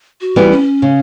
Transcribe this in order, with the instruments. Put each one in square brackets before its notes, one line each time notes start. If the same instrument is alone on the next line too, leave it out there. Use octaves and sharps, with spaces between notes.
[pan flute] F#4
[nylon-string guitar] E3 G3 B3
[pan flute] C#4
[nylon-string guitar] C#3